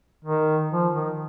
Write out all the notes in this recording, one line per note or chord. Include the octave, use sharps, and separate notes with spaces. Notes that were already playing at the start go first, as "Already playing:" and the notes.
D#3
F3
D#3